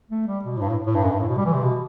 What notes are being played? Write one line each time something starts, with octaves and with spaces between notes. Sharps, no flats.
A3
G3
B2
A2
G2
A2
A2
G2
F#2
G2
A2
B2
G3
E3
C3
B2